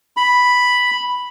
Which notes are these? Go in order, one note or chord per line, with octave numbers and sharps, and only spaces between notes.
B5